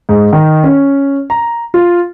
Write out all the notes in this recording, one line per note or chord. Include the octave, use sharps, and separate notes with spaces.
G#2
D#3
C#4
A#5
F4